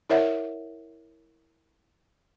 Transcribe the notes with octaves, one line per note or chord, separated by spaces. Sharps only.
E4 A#4 C#5 D5 E5 F#5